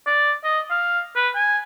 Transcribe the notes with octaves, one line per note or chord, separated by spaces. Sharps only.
D5
D#5
F5
B4
G#5